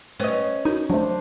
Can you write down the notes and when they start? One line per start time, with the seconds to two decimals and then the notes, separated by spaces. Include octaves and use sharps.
0.20 A3 C#4 B4 C5 D#5
0.65 D#4 F#4 A#4
0.90 F#3 A3 D4 C5